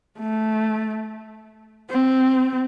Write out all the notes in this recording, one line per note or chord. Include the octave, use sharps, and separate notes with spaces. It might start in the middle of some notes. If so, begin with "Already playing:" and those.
A3
C4